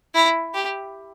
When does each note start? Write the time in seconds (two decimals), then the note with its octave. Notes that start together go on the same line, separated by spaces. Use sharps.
0.15 E4
0.54 G4